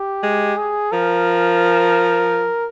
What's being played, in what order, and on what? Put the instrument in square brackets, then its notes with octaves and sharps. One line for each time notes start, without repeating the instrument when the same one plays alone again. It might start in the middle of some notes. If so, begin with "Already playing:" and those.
Already playing: [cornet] G4
[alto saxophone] G#3
[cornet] G#4
[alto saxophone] F3 [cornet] A#4